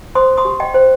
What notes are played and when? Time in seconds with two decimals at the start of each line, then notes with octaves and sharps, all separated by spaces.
0.15 C5 C6 D#6
0.37 C6 D#6
0.45 G4
0.60 D#5 G5
0.74 C5